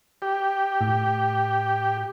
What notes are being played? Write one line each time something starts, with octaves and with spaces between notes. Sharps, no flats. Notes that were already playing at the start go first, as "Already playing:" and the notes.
G4
A2